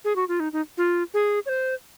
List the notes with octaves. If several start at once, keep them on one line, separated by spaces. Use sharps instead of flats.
G#4
F#4
F4
D#4
D#4
F4
G#4
C#5
C5